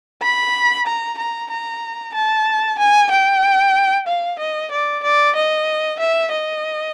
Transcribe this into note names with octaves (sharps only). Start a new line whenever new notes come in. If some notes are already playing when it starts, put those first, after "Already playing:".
B5
A#5
A#5
A#5
A5
G#5
G5
F5
D#5
D5
D5
D#5
E5
D#5